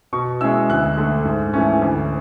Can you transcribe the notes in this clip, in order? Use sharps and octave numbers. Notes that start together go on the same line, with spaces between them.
B2 C#6
G#3 C#4 E4 E6
D2 F#6
D3 A3
G#2
E3 A3 C#4
D2